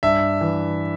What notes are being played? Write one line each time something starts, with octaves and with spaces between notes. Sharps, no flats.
G2 E5
E3